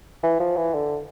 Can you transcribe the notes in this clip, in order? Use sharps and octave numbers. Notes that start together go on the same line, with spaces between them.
E3
F3
E3
D3